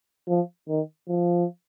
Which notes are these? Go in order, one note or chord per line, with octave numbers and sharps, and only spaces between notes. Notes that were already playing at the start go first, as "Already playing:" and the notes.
F3
D#3
F3